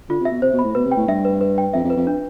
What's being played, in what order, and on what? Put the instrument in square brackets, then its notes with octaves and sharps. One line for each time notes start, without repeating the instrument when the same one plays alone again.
[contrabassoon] D3 [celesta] F4
[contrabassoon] C3 [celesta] E5
[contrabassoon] B2
[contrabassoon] C3 [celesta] C5
[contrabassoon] B2
[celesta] B5
[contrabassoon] A2
[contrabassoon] B2 [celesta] B4
[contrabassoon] C3
[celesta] G5
[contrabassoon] A2
[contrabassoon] G2 [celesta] E5
[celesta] B4
B4
G5
[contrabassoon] F2 [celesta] E5
[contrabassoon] F2
[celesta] B4
[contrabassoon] F2
[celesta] D4